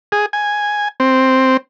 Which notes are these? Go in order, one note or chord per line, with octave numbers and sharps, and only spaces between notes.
G#4
G#5
C4